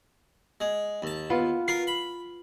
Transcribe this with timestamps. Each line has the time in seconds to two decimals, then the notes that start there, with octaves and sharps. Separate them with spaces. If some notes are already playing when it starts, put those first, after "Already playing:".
0.61 G#3
1.02 D#2 A5
1.30 B3 F4
1.68 F4 A#4 C7
1.87 B5